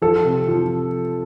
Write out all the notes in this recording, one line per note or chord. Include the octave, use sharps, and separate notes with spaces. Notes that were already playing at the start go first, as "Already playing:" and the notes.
F3 A4
C3
F3